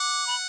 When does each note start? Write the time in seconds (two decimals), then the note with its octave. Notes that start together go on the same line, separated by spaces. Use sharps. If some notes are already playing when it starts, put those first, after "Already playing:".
Already playing: F#5 D6
0.27 B5